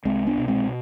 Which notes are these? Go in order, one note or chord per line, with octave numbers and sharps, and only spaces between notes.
C2 G#3 C4
B3 D4
B2
G#3 C4